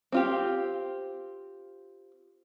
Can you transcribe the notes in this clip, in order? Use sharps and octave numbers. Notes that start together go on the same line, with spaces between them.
C4 F4 G4